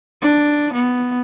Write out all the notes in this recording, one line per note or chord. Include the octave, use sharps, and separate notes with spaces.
D4
B3